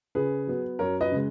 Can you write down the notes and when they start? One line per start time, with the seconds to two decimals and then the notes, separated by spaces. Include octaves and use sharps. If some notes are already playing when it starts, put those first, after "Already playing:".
0.15 C#3 G#4 B4
0.47 F#3 B3
0.79 F#2 A#4 C#5
1.01 B4 D#5
1.12 C#3 G#3